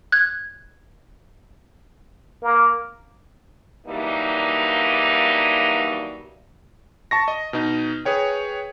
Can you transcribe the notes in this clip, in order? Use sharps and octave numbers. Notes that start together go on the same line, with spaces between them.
F#6 G#6
A#3
E3 F#3 G3 A#3 D4 D#4
A5 C#6 A#6
D#5
B2 D#4
G#4 B4 C#5 G5